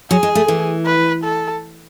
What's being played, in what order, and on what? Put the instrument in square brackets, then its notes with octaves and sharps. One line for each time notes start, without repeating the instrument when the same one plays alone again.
[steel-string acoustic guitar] F#3 [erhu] G#4
[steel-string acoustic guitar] G#3
A3
E3
[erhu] B4
A4